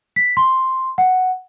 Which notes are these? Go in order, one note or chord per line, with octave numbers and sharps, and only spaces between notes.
B6
C6
F#5